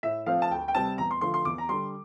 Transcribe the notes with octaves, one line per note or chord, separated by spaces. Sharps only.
A2 E5
F3 A3 C4 F5
A5
D2 G5
G5
C3 G3 C4 A5
E2 A#5
C6
D3 F3 A3 C6
C6
E2 D6
A#5
D3 G3 C6